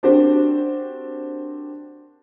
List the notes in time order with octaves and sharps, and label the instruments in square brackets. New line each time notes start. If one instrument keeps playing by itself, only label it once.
[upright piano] C4 D4 F#4 G4 A#4 C5